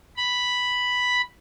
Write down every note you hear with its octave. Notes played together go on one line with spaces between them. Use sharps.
B5